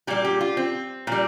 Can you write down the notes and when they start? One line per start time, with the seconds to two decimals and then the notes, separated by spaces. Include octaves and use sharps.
0.07 A#2 G3 G4
0.24 G4
0.41 F4
0.57 C4
1.07 A#2 G3